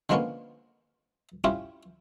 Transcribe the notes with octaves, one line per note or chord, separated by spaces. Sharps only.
D3 F3 G#3 A#3 B3 C#4
C#4 E4 F4 G4